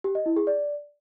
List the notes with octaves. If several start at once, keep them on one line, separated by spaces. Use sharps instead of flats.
G4
D#5
E4
G#4
D5